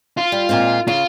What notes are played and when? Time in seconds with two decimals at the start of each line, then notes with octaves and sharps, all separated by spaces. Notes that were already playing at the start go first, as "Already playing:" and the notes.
0.17 F4
0.32 G3
0.49 A#2 G#3 C4
0.88 C#3 F4